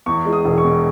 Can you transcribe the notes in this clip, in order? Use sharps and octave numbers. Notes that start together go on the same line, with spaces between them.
E2 C#6
G#3
D#6
E1
C#6
B2